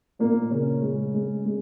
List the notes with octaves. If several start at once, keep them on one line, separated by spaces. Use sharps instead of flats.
A#2 A#3
C#3 C#4
G#3
G#3
G#3